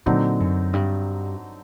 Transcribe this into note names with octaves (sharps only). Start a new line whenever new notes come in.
A#2 D3 F#3 C4 D#4
F#2
G2